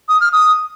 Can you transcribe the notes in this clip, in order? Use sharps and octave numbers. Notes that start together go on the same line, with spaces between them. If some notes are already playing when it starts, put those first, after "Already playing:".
D#6
F6
D#6